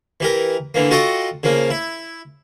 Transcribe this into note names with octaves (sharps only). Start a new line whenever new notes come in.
E3 G4 A#4
D3 E3 A#3
F4 F#4 A4 D#5 G5 C#6
C#3 F3 A#3
E4